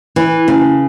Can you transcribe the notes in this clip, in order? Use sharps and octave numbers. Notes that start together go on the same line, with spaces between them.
E3
C#3